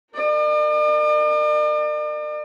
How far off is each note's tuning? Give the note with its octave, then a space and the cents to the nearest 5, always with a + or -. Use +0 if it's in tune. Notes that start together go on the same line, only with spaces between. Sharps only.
A#4 -25 D5 +45